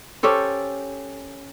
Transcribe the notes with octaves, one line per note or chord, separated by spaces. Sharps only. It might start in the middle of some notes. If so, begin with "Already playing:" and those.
C#4 G4 A4 C5